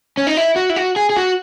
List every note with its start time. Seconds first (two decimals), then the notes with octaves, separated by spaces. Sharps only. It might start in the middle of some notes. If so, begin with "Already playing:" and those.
0.17 C#4
0.27 D#4
0.37 E4
0.56 F#4
0.70 E4
0.76 F#4
0.96 G#4
1.10 G#4
1.17 F#4